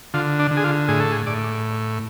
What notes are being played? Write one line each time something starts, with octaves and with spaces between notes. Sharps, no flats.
D3 F4
D4
D3
G#4
F4
A2 G#4
A4
G#4
A2 D5